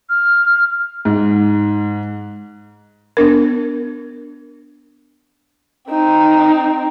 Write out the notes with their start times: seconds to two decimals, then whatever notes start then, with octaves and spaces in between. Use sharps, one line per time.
0.10 F6
1.05 G#2
3.17 B3 D4 A#4
5.90 C4 D#4